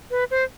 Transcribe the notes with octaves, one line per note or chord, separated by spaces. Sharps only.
B4
C5